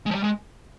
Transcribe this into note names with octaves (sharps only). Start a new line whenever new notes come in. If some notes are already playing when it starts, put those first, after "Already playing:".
G#3
F3
G3
G#3